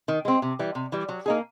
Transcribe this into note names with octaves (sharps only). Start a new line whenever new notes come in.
D#3
G#3 C4
C3
E3 G3
C3
E3 G3
F#3
A#3 D#4 G#4